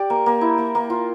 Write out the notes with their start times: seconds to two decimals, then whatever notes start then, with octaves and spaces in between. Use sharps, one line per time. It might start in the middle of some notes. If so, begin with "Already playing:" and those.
Already playing: G4 D5
0.10 A#3
0.26 A#3
0.41 E4
0.58 A#3
0.75 A#3
0.90 F4